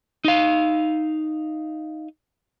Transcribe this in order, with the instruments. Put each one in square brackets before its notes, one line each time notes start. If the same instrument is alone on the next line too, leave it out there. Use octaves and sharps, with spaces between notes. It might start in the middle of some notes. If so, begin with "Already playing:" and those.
[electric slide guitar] D#4 F5